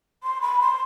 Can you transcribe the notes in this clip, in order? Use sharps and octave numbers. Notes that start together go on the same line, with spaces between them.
C6
B5
C6